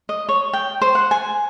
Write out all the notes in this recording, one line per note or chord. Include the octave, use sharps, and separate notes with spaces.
D#5
C#5
G5
C5
F#5
G#5